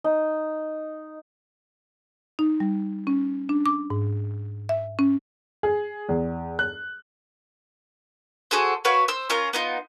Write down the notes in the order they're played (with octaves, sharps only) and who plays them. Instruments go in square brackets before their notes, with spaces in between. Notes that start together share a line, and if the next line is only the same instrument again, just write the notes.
[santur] D#4
[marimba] D#4
G3
C#4
D4
D6
G#2
E5
C#4
[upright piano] G#4
E2
F#6
[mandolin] F#4 G#4 A4 C5
F#4 B4 C#5 F5
C5 E6
C#4 F4 A#4
B3 D#4 F4